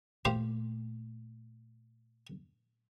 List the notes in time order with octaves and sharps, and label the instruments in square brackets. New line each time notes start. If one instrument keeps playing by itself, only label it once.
[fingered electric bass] A#2 A3 [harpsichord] G4 C5 F5